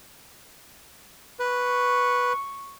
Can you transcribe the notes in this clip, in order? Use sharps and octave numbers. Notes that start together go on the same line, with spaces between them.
B4 C#6